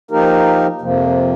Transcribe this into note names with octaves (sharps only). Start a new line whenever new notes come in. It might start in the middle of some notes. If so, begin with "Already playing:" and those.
F3 A#3 D#4 G4 A#4
F2 C3 F3 A#3